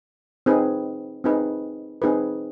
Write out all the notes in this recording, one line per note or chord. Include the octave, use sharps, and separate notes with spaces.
C4 D#4 G#4 B4
C4 D#4 G#4 B4
C4 D#4 G#4 B4